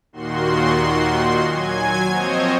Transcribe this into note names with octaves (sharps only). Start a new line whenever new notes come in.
D#2 A#2 D#3 F#4 C6
F#3 G#5 G#6
F3 C4 C5 C#5 D#5